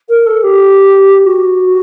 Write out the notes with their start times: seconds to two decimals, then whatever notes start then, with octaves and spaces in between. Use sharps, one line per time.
0.09 A#4
0.26 A4
0.43 G4
1.25 F#4